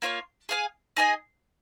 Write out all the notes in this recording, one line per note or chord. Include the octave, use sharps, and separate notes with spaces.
A#3 F4 C#5 F5
G#4 F5 G#5
D#4 G#4 D#5 G#5